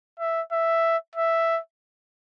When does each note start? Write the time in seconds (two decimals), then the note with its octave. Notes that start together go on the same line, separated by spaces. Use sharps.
0.20 E5
0.52 E5
1.16 E5